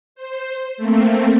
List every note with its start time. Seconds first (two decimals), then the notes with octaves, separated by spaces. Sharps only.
0.15 C5
0.77 A3 A#3 C4